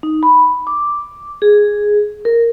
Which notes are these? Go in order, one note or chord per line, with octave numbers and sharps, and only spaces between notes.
D#4
B5
D6
G#4
A#4